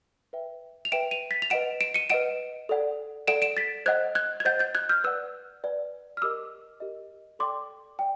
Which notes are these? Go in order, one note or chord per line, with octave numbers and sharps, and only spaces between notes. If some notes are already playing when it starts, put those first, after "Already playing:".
B4 E5 G5
F7
B4 E5 G5 D7 E7
D#7 F7
A6 B6
F7
B4 D#5 F#5 D7 E7
D7 E7
C#7 D#7
B4 D#5 F#5 D7 E7
A4 D5 F#5
A4 D5 F#5 D7 E7
D7 E7
A6 B6
C5 D#5 F#5 F#6 G#6
F#6 G#6
G#6
C5 D#5 F#5 G6 A6
G6 A6
F#6 G#6
F6 G6
B4 D5 F#5 E6 F#6
B4 D5 F#5
F6
G4 A#4 D#5 D6 E6
G4 A#4 D#5
A4 D5 G5 C6 D6
D5 G5